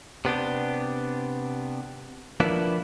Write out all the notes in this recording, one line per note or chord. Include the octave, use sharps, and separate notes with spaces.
C3 B3 D4 G4
F3 A#3 B3 D4 E4 B4